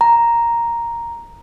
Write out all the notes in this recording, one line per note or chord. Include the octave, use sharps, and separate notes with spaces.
A#5